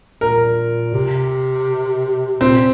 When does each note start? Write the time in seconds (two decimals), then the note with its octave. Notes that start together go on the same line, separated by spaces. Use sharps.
0.21 A#2 A#4
0.94 C3
2.41 A#2 C4